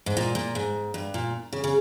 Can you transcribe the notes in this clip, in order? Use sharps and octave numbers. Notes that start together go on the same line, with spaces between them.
G#2
A#2
A#2
G#2
G2
A#2
C#3
C#3